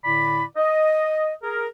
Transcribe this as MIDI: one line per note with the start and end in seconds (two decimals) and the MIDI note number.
0.04 0.43 45
0.04 0.43 50
0.04 0.43 64
0.04 0.43 74
0.04 0.43 83
0.57 1.33 75
1.43 1.67 68
1.43 1.67 70